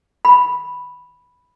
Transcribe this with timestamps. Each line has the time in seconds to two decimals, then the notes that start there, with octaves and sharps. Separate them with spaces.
0.25 B5